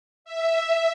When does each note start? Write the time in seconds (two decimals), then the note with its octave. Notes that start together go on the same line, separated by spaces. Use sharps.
0.25 E5